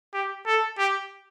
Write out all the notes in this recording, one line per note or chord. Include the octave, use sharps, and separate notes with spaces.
G4
A4
G4